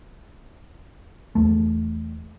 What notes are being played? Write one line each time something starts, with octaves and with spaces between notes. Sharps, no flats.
E2 A3